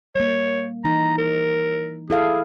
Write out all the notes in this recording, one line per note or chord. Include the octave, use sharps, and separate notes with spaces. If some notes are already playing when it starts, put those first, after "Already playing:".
G3 A#3 C#5
E3 D#4 A#5
A#4
E4 G#4 A4 F5